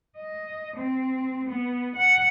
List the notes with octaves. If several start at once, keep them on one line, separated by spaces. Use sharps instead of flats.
D#5
C4
B3
F#5